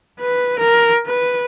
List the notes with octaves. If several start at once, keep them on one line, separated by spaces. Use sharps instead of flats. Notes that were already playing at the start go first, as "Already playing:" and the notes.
B4
A#4
B4